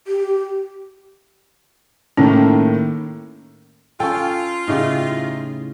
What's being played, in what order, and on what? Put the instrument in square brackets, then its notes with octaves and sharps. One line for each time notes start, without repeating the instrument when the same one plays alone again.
[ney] G4
[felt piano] A2 D#3 A#3 [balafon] C#4
[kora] C#4 A4 [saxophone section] F4 [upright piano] G5
[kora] A2 C#3 G4 [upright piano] D#4 E4